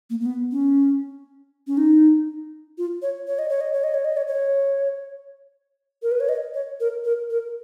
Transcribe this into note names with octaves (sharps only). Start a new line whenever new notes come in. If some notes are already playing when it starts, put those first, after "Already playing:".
A#3
A#3
B3
C#4
C#4
D#4
F4
C#5
C#5
D#5
C#5
D#5
C#5
D#5
C#5
D#5
C#5
C#5
A#4
B4
C#5
D#5
C#5
A#4
A#4
A#4